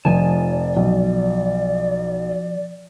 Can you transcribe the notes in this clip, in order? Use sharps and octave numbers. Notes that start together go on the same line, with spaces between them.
F1 F3 D5 G#5 A5
B1